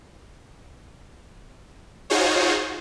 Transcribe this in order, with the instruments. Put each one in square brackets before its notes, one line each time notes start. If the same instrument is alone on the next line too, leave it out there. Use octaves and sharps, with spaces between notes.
[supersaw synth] D#4 F4 F#4 G#4 C5 C#5